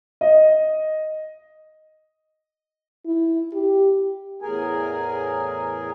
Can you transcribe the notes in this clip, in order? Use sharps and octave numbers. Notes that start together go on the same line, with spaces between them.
D#5
E4
G4
E2 A2 G#4 A#4 G#5